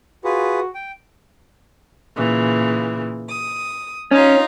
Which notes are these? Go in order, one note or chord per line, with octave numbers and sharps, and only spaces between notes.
F4 F#4 G#4 B4
G5
A#2 C#3 E3
D#6
C#4 D#4 F4 A#5